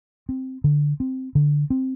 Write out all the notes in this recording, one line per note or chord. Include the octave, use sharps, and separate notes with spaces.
C4
D3
C4
D3
C4